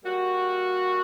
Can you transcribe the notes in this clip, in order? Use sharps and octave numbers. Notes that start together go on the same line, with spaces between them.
G3 A#3 F#4